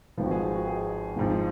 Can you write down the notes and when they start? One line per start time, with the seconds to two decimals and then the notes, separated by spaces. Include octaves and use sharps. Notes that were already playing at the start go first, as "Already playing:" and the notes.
0.18 G#1 G#2 F3 B4
0.26 F#4
0.31 G#4
0.43 F#4
0.55 F#4
0.68 G#4
1.17 G#1 G#2 F3